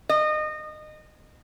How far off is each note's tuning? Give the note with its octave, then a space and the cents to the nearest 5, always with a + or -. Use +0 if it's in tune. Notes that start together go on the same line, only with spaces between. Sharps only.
D#5 -25